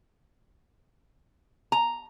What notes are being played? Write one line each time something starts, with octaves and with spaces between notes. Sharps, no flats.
A#5